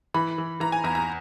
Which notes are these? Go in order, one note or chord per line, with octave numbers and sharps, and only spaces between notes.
E3 B5
E3
E3 A#5
G#5
E2 A#5
A#5